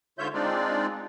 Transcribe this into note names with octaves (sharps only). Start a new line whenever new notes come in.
G#2 D3 F4 C#5 E5 G6
G#3 C4 D4 D#4 F4 D5